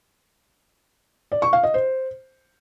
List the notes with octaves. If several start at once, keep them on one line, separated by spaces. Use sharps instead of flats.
D5
C#6
F5
D#5
C5